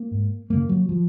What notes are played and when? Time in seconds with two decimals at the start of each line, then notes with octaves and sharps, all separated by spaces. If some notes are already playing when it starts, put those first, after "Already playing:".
Already playing: A#3
0.11 G#2
0.50 F#2 C#3 A#3
0.69 F#3
0.89 F3